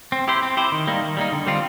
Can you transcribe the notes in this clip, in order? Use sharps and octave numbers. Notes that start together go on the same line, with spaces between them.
C4
E4 G4 C5
C4
E4 G4 C5
D#3
G3 A#3 D#4
D#3
G3 A#3 D#4
D3
G3 C4 F4